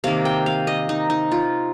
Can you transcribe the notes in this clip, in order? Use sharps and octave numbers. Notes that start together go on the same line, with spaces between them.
C3 D#3 A#3 F5
G5
F5
D#5
D#4
D#4
F4